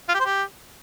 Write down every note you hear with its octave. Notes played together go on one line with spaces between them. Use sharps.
F4
G4
C5
G4